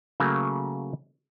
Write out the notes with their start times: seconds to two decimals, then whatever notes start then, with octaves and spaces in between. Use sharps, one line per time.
0.20 C#3 F#3 A3 A#3